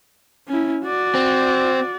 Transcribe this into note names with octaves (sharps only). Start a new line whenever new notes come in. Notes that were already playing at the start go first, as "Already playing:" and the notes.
C#4 E4
F#4 D5
C4